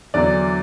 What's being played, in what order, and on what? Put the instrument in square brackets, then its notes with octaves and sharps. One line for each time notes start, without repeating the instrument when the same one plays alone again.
[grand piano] E2 D3 F#3 D5